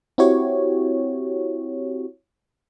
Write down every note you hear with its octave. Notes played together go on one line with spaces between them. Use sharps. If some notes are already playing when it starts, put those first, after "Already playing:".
C4 E4 F#4 G4 C#5